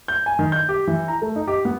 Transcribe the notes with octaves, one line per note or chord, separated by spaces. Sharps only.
G6
G#5
D#3
G6
G4
E3
A#5
A3
D#4
G4
B3